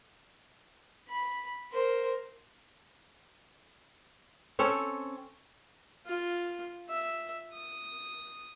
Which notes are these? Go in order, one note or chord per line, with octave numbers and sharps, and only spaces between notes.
B5
A#4 C5
C4 C#4 A4 C#5
F4
E5
D#6